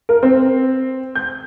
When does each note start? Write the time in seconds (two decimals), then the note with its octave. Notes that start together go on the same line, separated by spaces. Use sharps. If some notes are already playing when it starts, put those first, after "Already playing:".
0.09 A#4
0.23 C4
1.15 G6